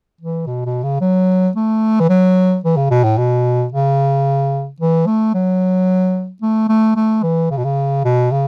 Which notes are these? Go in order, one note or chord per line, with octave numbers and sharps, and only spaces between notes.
E3
B2
B2
C#3
F#3
A3
E3
F#3
E3
C#3
B2
A2
B2
C#3
E3
A3
F#3
A3
A3
A3
E3
C#3
B2
C#3
B2
C#3